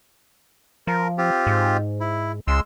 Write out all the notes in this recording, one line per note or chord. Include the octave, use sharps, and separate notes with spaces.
F3 A#4
C4 F4 G4
G#2
E4
C#2 G#3 C6 E6